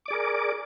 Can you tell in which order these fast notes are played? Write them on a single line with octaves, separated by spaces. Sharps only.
D6 D5 G#4 A#4